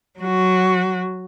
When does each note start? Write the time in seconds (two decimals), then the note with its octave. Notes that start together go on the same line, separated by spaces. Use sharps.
0.19 F#3 F#4